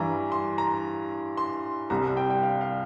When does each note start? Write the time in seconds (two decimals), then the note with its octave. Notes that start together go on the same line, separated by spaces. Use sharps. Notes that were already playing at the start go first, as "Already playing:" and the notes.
Already playing: G2 E3 G3 A#5
0.32 C6
0.58 A#5
1.37 C6
1.90 C2 C3 G3 A#5
2.17 G5
2.30 G5
2.43 F5
2.61 F5